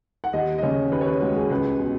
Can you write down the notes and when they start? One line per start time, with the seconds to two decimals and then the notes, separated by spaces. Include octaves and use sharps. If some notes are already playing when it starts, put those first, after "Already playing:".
0.24 F#5
0.33 D#2 D#5
0.58 D#5
0.62 C#3 C#5
0.92 D#2 B4
1.01 C#5
1.06 B4
1.21 G#3 F#4
1.36 G#4
1.50 C#2 B4
1.80 B2